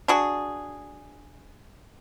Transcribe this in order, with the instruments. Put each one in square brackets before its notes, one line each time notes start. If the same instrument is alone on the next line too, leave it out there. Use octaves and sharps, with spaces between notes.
[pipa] D4 F#4 G#4